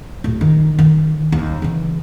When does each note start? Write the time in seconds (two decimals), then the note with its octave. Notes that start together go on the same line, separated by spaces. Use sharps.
0.24 D1
0.41 D#3
0.79 D#3
1.32 D#2
1.62 C#3 E3